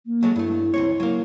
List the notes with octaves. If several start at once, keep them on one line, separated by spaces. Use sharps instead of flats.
A#3
F#3 G#3 A3
G2 A3 E4
C#2 C4 C#5
F#3 A#3